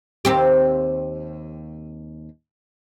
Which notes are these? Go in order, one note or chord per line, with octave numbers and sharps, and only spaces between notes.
D#2 C4 G4